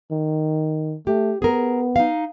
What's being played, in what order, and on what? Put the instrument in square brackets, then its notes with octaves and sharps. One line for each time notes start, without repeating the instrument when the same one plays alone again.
[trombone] D#3
[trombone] A3 [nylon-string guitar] G4
[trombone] B3 [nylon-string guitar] G#4 A#4
[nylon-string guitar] D#4 F5